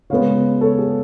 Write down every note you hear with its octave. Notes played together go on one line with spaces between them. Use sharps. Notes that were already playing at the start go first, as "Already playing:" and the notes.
C#3 G#3 B3 C#5 F5
A4 C#5
G#4